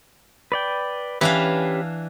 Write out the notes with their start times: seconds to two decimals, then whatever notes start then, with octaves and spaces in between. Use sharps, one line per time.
0.52 B4 D5 G5
1.21 E3 C#4 D4 G4 B4 F5